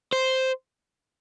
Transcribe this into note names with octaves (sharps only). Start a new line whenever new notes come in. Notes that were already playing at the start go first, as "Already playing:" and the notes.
C5